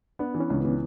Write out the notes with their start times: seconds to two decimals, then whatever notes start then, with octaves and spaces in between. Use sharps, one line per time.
0.19 B3 D4
0.35 E3
0.40 C#4
0.50 C#2
0.60 E3 B3